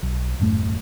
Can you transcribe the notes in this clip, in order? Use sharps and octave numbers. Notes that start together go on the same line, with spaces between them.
B1
D#1 F#2 A2 A3